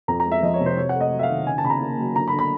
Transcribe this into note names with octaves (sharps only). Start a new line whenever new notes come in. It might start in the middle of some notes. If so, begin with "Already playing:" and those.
F2 A#5
A#5
G#3
E5
F3 D#5
C#5
C3
C5
C3 C#5
F#5
A3
D#5
F#3
E5
F5
D#3
C#3 G#5
A5
C#3 B5
A#5
A#3
F#3
D3 A#5
B5
D3
B5